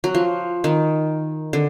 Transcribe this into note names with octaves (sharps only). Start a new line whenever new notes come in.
F#3
F3
D#3
D3